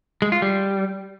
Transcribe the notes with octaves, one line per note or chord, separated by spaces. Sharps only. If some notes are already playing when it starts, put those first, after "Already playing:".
G#3
F4
G3